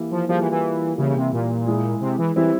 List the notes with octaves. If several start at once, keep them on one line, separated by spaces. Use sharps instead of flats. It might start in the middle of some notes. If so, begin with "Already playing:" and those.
Already playing: E3 A#3 E4 G4
F3
F3 G3 A#3 F4 G#4
E3
E3
C#3 E3 G3 A#3 E4
C3
A#2
G#3 E4 G#4
C3
E3
E3 G3 C4 E4